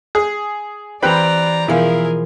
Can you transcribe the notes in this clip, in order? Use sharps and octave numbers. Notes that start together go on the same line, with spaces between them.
G#4
E3 C4 G4 B4 D5 G5 A#5 B5
B2 E3 F3 E4 G#4 A#4 F5